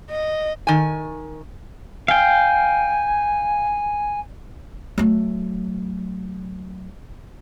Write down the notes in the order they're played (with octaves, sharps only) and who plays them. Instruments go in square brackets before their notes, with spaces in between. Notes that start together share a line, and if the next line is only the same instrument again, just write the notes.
[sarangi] D#5
[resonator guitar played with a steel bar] D#3 G#5
[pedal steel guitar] F5 G5 [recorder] G#5
[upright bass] F#3 A3